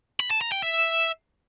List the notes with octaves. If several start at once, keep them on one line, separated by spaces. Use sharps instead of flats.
B5
A5
A#5
G5
E5